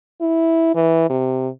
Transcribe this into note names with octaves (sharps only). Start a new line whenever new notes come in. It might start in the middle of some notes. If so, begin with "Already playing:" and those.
E4
E3
C3